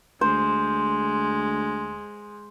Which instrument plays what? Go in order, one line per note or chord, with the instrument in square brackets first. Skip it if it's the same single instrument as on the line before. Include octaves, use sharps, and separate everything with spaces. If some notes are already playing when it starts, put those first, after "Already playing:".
[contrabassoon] D2 [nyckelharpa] G#3 [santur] C5